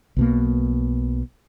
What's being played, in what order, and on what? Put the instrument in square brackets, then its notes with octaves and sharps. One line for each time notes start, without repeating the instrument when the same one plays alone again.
[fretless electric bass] B1 B2 A#3